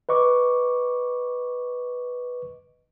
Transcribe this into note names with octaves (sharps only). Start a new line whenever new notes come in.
B4 D#5 C#6 D6